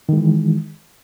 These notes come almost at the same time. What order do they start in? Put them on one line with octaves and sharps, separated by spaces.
D#3 G#3 E3